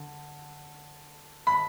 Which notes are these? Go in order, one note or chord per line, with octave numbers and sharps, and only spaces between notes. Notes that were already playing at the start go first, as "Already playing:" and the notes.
Already playing: D3
B5